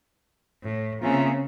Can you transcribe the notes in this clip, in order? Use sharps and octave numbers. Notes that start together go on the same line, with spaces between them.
A2
C#3 A#3 C4 F4 E5 G#5 A#5